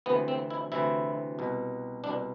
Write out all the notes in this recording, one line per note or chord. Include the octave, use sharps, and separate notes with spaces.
D2 C3 E3 B3
C4
E4
D2 C3 E3 E4
C2 B2
C2 B2 D4